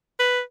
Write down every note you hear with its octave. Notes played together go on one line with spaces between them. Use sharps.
B4